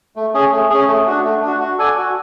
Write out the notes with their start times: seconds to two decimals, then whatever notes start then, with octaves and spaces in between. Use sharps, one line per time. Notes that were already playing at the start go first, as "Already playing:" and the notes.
0.16 A3
0.34 C#4 G#4
0.52 A3
0.70 C#4 G#4
0.88 A3
1.07 D4 F#4
1.25 A3
1.42 D4
1.48 F#4
1.60 F#4
1.79 A4 D5 G#5
1.98 F#4